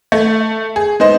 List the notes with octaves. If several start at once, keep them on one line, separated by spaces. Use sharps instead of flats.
A3
G#4
G#3 B3 D#4 C5 D#5